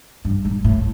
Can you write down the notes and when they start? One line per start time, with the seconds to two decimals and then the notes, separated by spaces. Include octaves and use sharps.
0.25 G2
0.45 G#2
0.64 A2